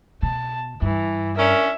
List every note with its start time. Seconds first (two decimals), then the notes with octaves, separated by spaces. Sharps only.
0.23 B2 A5
0.82 G2 E3
1.37 C#4 D4 A#4 E5